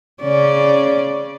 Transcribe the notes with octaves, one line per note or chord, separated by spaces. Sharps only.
C#3 C#4 D5